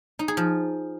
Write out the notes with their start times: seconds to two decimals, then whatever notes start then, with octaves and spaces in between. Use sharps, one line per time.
0.19 D#4
0.28 G#4
0.37 F3